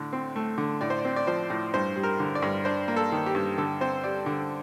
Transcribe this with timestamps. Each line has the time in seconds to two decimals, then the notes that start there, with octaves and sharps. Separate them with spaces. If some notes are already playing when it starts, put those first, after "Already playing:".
Already playing: A2 D3
0.13 C4
0.36 A3
0.58 D3
0.81 A2 D5
0.90 C5
0.99 D5
1.05 C4
1.16 D5
1.27 F3 C5
1.50 A2
1.74 G2 C5
1.96 G3
2.03 A#4
2.20 D3
2.35 D5
2.42 G2
2.65 D4 C5
2.88 A#3
2.96 A4
3.12 D#3
3.26 G4
3.35 G2
3.58 D3 A4
3.81 C4 C5
4.04 G3 D5
4.26 D3